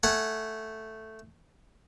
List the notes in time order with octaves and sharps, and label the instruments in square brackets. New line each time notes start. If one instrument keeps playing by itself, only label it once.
[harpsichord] A3 F#5 G#5